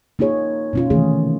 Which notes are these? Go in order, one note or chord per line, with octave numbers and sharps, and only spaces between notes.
A#3 D#4 F4 G#4 C#5
B2 C#4 F4
C3 D#3 E3 A3 G#4